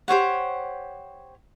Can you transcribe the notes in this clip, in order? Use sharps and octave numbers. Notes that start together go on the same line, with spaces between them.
G4 C5 C#5 F#5